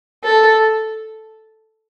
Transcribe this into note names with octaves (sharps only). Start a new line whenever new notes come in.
A4